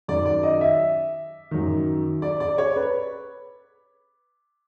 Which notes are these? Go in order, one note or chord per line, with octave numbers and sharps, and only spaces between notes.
F#2 D#3 D5
D5
D#5
E5
F#2 D#3
D5
D5
C#5
B4